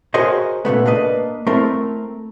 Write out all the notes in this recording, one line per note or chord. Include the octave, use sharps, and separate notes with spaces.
F#4 G#4 A#4 C5 C#5 D#5
A#2 C#3 A3 B3
A#3 D4 B4 D#5
A3 C4 E4 A#4